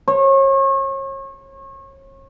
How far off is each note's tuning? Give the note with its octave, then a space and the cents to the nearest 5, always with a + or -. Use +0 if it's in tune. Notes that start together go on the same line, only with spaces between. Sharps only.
C#5 -35